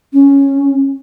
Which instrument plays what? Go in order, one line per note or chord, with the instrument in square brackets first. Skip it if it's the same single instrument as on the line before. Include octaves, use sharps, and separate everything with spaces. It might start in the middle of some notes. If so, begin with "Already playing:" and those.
[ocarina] C#4